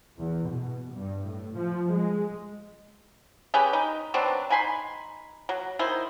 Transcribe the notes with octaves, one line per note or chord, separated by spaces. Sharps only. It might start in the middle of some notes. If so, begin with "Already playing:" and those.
E2
B2
G2
A2
F3
G#3
C#4 G4 G#4 B4
D#4
B2 F#3 C4 D4
D#4 G#5 B5 C6
F#3
D#3 D#4 E4 C5